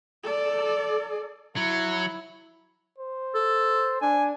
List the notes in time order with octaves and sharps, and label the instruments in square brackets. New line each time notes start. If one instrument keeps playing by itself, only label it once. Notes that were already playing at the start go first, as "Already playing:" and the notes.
[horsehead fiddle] A4 D5
[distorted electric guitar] F#3 [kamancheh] E4
[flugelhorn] C5
[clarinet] A4
[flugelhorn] D4 [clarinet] G#5